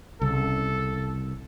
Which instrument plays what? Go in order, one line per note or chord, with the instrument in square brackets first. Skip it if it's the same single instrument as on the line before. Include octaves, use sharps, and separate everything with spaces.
[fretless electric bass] C2 [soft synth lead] C#3 [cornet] A4